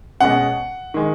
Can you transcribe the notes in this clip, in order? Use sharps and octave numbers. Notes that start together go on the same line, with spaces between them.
B2 G#3 C#4 F#5
D#3 G#3